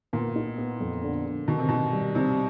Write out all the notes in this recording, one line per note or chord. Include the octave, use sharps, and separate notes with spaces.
A#2 B3
D#4
B3
F2
D3
D3
B2 D#3
C3
B2 D#3
G3
C3 D#4